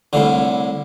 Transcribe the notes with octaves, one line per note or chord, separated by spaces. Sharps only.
C2 A2 D3